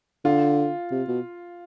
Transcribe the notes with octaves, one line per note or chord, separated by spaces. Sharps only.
D3 F4
C3
B2